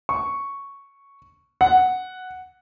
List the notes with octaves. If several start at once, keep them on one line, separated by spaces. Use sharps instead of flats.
C#6
F#5